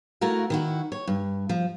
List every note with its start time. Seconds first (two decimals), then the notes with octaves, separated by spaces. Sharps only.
0.21 A3 E4 F#4 A#4 F5
0.50 D#3 E4 F#4
0.92 C#5
1.07 G2
1.49 F3